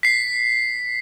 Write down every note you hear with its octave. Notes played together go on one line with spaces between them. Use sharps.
B6 C7